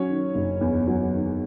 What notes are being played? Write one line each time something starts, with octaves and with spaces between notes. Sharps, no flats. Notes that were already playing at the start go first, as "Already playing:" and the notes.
Already playing: F#3 C#4 C#5
D#3
F#1
E2
F#3
D#3